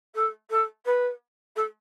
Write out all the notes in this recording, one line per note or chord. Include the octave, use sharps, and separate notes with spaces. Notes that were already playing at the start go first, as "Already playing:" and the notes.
A4
A4
B4
A4